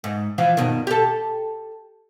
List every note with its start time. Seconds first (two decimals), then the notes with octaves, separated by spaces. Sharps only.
0.04 G#2
0.38 E3 F3 F4
0.57 G2 B2 D#3
0.87 G4 A4